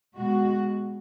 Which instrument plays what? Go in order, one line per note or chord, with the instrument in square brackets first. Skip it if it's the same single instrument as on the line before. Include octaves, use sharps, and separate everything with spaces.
[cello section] B2 G#3 F#4